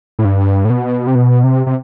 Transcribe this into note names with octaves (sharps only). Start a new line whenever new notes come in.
A2
G2
A2
B2
C3
B2
C3
C3